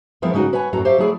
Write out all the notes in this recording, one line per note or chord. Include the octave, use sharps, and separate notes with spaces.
F3 G#3 B3 C4 E4 A#4
C#3 G#3 D#4 F#4 A#4
B4 C#5 F#5 G#5
F#2 A2 F#4 A4 A#5
G4 C5 C#5 E5 F5
F#3 A3 E4 G#4 D5